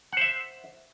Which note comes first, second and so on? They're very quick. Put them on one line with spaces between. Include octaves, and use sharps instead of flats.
F#5 C5 E5